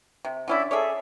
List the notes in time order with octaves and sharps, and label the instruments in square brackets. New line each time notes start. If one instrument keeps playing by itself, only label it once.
[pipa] C3
[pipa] D3 C#4 D5 [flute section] E4
[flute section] G#4 A4 [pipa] C#5 D5 E5